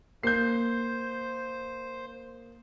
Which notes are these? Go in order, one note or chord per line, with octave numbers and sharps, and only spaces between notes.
A#3 C5 G6 C7